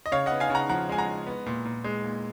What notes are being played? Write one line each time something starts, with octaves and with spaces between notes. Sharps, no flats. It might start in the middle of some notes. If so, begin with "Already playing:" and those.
D#5
C#3 C#5 F5
B3 D#5 F#5
F5 G#5
C#3
F#5 A#5
F3 F#5 A#5
G#3 G#5
F#5 A#5
G#3
B3
A#2
A#2
G#3
A#2